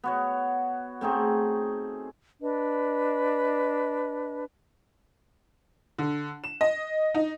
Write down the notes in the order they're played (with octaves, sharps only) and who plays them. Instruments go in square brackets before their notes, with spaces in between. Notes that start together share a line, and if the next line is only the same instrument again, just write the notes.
[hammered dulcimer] B3 F#4 C#5
A3 C4 D#4 G#4
[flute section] D4 B4 D#5
[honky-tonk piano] D3
E7
D#5
D#4